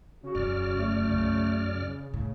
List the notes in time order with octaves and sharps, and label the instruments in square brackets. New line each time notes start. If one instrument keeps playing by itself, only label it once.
[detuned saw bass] C#3 [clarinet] F#4
[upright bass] E1 [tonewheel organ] F#2 D5 F6
[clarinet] A3
[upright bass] B1 [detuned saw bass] C#3
[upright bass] A2 [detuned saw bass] C#3